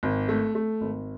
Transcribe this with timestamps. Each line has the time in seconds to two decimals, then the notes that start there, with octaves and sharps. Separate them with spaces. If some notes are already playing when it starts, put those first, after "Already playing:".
0.03 G#1
0.29 A3
0.55 A3
0.81 G#1